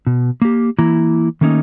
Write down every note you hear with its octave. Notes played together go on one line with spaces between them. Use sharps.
B2
A#3 G4
E3 A#3 E4 A#5
D#3 A3 A#3 C#4 D#4